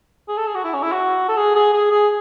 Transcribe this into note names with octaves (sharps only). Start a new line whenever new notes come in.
G#4
A4
G#4
F#4
E4
C#4
E4
F#4
A4
G#4
G#4
G#4
G#4